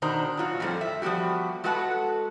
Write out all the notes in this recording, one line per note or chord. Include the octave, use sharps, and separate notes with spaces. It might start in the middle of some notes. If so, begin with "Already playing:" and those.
B2 D#3 D4 C5 A#5
A#2 F#3 F4 F#4
F2 A2 G3 A4 C5
E5
F3 G3 B3 F#4 G4
G#3 F#4 A4 B4 F#5 A5